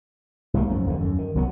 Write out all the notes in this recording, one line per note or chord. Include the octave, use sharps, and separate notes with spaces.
C2 G#2 A3 A#3
F#2 F3
D#2 D3 D#3
F#2
D#3
C2 F#3 B3